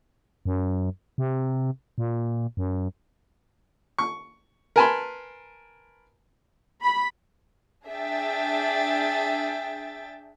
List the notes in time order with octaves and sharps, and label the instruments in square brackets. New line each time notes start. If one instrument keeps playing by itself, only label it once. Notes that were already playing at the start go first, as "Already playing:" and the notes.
[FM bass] F#2
C3
A#2
F#2
[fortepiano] C#6
A#4 B4 G#5 A5 B5 C6
[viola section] B5
[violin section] D4 G#4 E5 G5 A6